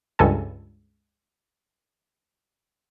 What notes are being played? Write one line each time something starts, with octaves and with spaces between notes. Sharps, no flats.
C#2 G2 A4 G#5